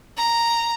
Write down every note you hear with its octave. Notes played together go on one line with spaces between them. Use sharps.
A#5